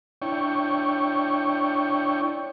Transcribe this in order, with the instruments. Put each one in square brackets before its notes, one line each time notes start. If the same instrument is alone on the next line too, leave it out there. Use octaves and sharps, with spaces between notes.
[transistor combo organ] D4 E4 C#5 G5 C#6